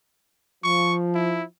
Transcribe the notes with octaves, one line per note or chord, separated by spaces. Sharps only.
F3 C#6
E4